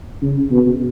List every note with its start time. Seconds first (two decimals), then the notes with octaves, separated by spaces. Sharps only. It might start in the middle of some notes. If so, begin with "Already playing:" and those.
0.22 C#3
0.51 B2